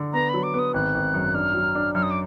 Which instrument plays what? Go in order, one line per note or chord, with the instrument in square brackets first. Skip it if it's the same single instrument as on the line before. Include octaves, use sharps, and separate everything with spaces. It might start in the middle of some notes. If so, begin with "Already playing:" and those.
Already playing: [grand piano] D3
[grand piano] B3 [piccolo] A#5
[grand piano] F#3 [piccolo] B5
[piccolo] D6
[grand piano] B3 [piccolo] D#6
[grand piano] G#1 [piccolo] F#6
[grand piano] G#1
F#2
[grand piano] D4 [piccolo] F6
[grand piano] F#3
D4
[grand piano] F#2 [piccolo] F6
[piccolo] D#6
D6